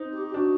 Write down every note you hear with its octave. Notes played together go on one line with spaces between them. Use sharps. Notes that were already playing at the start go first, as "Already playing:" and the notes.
Already playing: C4 D#4
G4
G4
D4 F#4